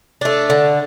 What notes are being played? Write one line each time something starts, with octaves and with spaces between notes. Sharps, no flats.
A3 D4
D3